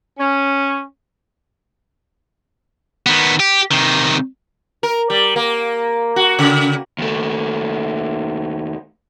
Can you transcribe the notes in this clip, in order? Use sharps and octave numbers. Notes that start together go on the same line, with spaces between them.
C#4
D#3 B3
G4
C3 D#3
A#4
G3
A#3
F#4
C#3
D#2 A3